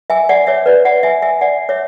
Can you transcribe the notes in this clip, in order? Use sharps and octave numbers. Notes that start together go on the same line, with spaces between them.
E5 G#5
D5 F#5
C#5 E5
B4 D5
D5 F#5
E5 G#5
E5 G#5
D5 F#5
C#5 E5